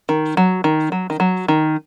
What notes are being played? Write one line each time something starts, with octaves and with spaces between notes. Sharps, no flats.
D#3
F#3
D#3
F#3
D#3
F#3
D#3